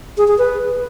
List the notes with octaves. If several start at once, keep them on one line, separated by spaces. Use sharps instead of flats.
G#4
G#4
B4